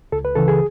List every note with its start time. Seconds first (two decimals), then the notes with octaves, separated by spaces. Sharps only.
0.12 C#2 A4
0.25 B4
0.35 C#3 E3 A4
0.48 G#4